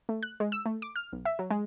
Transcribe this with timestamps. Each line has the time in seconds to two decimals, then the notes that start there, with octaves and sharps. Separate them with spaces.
0.09 A3
0.23 F#6
0.40 G#3
0.52 E6
0.66 A3
0.82 D6
0.96 F6
1.13 B1
1.25 E5
1.39 F#3
1.50 G#3